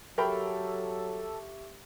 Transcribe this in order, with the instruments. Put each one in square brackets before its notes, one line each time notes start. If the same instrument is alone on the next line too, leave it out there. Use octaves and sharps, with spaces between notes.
[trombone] F#3 [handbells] G4 E5 C#6 [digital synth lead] A4 [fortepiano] A#4 G5 B5